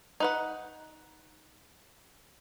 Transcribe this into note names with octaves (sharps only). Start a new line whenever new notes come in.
D#4 B4 F#5